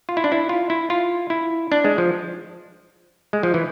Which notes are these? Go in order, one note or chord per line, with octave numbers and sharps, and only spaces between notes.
F4
E4
D4
E4
F4
E4
F4
E4
D4
G#3
F3
G#3
F3
E3